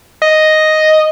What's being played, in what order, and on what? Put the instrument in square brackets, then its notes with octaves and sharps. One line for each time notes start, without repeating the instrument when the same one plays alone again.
[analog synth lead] D#5